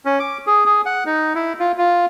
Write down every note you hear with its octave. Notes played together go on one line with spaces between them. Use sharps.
C#4
D6
G#4
G#4
F#5
D#4
E4
F4
F4